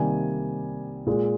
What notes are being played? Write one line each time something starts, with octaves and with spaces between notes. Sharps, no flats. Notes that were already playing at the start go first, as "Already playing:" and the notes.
Already playing: C3 D#3 G3 A#3 G#5
A#2 G#3